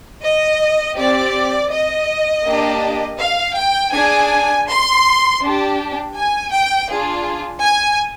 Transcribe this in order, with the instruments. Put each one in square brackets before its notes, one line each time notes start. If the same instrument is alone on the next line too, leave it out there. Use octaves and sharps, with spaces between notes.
[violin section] D#5
C4 G4 D5
D#5
A#3 D4 G4
F5
G5
D4 G#4 G#5
C6
D4 G4
G#5
G5
D4 F4 G#4
G#5